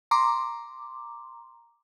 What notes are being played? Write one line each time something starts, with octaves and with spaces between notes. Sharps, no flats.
A#5 C6 D6